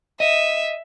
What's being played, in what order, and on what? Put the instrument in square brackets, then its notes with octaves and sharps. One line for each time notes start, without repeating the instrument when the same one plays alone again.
[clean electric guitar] D#5 [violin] E5